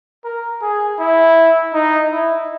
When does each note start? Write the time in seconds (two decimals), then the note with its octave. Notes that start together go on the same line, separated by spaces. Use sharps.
0.24 A#4
0.62 G#4
0.99 E4
1.74 D#4
2.11 E4